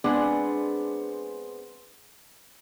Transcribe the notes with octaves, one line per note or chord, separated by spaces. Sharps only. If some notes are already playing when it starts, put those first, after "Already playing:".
G#3 B3 C4 D4 G#4